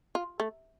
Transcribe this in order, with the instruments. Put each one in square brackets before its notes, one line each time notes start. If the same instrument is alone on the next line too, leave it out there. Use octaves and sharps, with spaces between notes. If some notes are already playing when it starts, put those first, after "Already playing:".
[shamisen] F4
A3